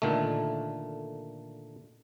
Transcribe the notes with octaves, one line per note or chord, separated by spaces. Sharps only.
A#2 D3 D#3 A3